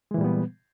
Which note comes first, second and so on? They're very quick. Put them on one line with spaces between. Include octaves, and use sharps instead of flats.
G#3 E3 A#2 G3 B3